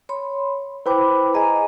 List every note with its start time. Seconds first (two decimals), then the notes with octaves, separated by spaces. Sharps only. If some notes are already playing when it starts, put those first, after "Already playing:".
0.09 C#5 B5 C6
0.86 E4 B4 C5 G5 B5 D6
1.34 G#4 D#5 G#5 A#5